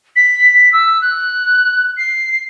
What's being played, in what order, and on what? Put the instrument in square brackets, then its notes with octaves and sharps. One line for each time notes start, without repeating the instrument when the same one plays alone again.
[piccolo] B6
E6
F#6
C7